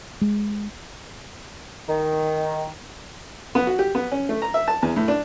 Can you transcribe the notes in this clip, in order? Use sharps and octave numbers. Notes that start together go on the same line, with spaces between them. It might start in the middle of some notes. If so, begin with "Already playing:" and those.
G#3
D#3
B3
F#4
G4
B3
C#4
A3
A#5
E5
A5
E2
A2
D4